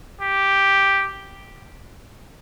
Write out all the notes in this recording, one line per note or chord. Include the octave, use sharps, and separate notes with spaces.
G4